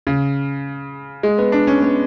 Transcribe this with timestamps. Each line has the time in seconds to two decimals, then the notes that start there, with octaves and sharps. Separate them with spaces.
0.07 C#3
1.23 G#3
1.38 B3
1.52 D4
1.67 C#4
1.82 B3